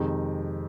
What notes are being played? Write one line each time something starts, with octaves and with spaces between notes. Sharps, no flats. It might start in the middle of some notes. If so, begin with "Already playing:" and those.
Already playing: F2 C3 D#3 G#3